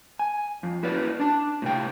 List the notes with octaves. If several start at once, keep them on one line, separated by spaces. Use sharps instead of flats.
G#5
F2
E4 F#4 B4 D5
D4 A5
A2 C3 G5